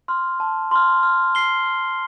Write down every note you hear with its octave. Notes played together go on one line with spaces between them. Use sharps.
C6 F6
A5
C6 F6
F6
C7 G7
F6